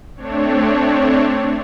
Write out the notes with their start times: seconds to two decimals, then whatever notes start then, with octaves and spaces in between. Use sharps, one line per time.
0.16 A3 C4 D4 C#5